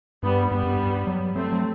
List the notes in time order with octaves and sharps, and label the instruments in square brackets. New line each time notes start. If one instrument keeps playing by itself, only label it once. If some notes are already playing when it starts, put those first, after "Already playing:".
[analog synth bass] G2 [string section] G3 B3
[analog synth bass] G2 [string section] G3 B3
[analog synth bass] F#2
G2
F#3
[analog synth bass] F#3 [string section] A3 C4
[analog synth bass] F#3